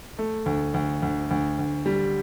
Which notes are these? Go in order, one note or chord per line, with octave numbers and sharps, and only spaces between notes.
A3
D2
D2
D2
D2
D2
G3